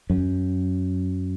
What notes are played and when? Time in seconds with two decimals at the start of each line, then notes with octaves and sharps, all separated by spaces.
0.10 F#2